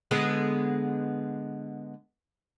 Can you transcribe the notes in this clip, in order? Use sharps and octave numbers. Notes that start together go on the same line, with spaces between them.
D3 G#3 B3